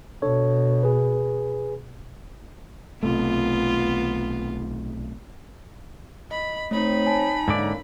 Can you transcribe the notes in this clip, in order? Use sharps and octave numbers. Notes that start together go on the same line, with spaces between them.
B2 D4 A4 C#5
G#4 B4
B1 C3 A3 B3 F4
D#5 B5
A3 C4 D#4 C#5 B5
G#5 A5
G#2 D3 E3 A#3 C#4 D5